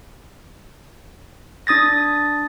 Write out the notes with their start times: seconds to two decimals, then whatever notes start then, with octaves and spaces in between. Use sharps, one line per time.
1.67 D4 D#6 A6 A#6